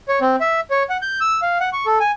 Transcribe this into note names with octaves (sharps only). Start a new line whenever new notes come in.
C#5
C4
E5
C#5
F#5
G6
E6
F5
F#5
C#6
A4
G#5